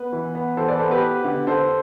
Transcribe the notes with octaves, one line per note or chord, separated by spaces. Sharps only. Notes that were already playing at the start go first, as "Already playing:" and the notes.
Already playing: B3 B4
E3
B3
E3 A4 C5
B4 D5
B3 A4 C5
G4 B4
B3
D3
D3 A4 C5